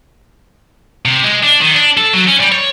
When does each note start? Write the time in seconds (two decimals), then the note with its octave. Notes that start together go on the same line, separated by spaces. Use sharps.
1.05 C3
1.23 G#3
1.43 D4
1.61 D#3
1.74 D4
1.97 A4
2.13 F#3
2.28 C#4
2.40 G3
2.52 C#5